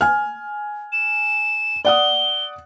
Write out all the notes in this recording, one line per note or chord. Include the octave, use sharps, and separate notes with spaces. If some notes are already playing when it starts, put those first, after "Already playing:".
G#5 F6
E7
D5 F#5 D#6 G7